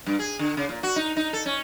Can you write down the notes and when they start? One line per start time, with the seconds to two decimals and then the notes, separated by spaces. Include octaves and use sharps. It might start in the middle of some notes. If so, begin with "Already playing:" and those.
0.06 G2
0.19 G#4
0.39 D3
0.57 C#3
0.69 A#2
0.83 F#4
0.96 D#4
1.17 D#4
1.33 A4
1.46 C#4